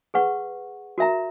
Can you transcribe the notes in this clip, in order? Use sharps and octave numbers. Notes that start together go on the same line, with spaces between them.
G#4 B4 F#5 C#6
F#4 A#4 E5 A#5